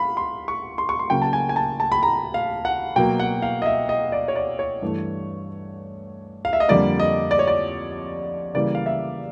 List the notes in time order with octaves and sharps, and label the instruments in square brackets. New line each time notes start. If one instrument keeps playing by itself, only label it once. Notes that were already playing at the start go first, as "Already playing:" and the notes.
Already playing: [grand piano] F5 B5
C6
C#6
C6
C#6
C6
C#3 F#3 A#3 G5
A5
G#5
G#5
A5
A5
B5
A#5
F5
F#5
B2 F#3 A#3 G5
F#5
F5
D#5
E5
D#5
D5
C#5
D5
C#5
G2 E3 A3
F5
E5
D#5
F2 D3 G3 A#3 D5
D#5
D5
C#5
D5
C#3 E3 G3 A#3 D5
F5
E5